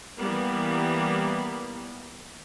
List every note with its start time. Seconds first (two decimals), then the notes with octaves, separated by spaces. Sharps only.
0.19 E3 G3 A#3 B3